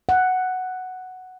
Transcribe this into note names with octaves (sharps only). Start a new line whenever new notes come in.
F#5